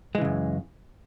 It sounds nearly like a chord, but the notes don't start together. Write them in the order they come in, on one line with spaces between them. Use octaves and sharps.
G#3 E3 C#3 F#2